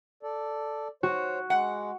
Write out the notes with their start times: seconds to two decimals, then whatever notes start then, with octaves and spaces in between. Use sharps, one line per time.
0.23 A4 D5
1.03 F#4 C5 C#5
1.50 G#3 F#5